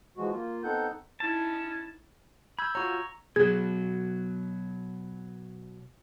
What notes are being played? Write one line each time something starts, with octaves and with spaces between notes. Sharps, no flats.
E3 F3 G#3 F#4
A#3 F4
B3 C4 D#4 A4 F#5 G6
C#4 D#4 E4 A5
B5 E6 G6 G#6
F4 F#4 C#5 A#5 C#6
B2 F#3 G#4 G#6